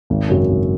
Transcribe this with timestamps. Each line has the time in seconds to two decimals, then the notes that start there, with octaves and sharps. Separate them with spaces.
0.10 G#1
0.29 F#2 C#3 F#3
0.49 G#1